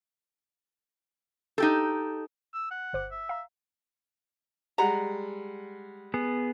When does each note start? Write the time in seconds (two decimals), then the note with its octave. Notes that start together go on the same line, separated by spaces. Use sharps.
1.58 D#4 G4 A4
2.54 E6
2.71 F#5
2.93 G1 C5 D6
3.11 E5
3.29 F5 A#5
4.78 G3 G#3 F#5 A#5
6.14 B3 G#4